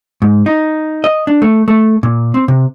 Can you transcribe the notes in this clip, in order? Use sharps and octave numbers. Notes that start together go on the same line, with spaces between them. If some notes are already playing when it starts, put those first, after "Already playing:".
G#2
D#4
D#5
D4
A3
A3
A#2
C4
C3